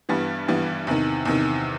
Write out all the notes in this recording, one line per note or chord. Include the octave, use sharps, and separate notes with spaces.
G2 E3 G3 B3
G2 E3 G3 B3
E2 C3 D#3
E2 C3 D#3